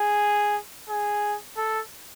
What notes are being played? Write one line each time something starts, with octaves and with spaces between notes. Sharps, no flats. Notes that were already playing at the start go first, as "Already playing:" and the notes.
Already playing: G#4
G#4
A4